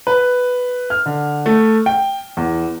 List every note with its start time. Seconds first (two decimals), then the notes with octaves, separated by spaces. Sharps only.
0.07 B4
0.90 F6
1.06 D3
1.46 A3
1.86 G5
2.37 E2